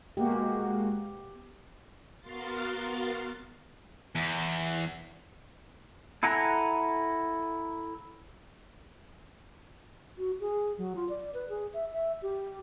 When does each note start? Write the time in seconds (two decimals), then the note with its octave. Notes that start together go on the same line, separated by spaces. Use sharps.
0.17 G#3 A#3 B3 F#4 G4
2.20 B3 F#4 A#4 F5 C6 A6
4.15 E2
6.23 E4 A4 F#5 G#5 A#5
10.18 F#4
10.40 G#4
10.78 F#3
10.96 F4
11.09 D5
11.34 B4
11.49 G#4
11.74 E5
11.92 E5
12.22 G4